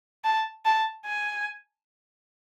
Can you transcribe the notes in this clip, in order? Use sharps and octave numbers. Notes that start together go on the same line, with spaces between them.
A5
A5
G#5